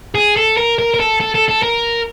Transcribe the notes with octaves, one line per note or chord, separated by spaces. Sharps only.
G#4
A4
A#4
A#4
A#4
A4
A4
A4
A4
A#4